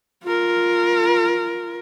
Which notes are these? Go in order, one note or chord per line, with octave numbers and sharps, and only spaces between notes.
F4 A#4